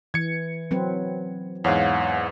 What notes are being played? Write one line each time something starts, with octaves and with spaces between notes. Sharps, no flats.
E3 G#6 C#7
F#3 C4 B4
E2 G#2 C#5 F5 F#5